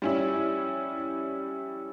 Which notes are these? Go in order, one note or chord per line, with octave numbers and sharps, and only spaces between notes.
G3 C#4 E4